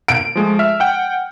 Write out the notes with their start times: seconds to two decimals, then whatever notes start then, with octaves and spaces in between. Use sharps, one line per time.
0.08 D7
0.35 F3 G#3 A3
0.59 E5 F6
0.80 F#5 G5